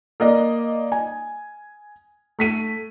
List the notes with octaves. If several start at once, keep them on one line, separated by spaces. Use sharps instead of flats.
A#3 D5 D#5
G#5
A3 B6 D#7